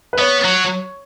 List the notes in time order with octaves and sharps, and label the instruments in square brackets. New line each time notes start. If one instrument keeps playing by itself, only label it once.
[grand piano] B4
[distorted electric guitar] B3 [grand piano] C#5
[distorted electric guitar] F#3